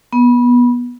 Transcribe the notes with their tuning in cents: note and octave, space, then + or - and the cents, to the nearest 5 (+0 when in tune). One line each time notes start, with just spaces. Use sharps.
B3 -20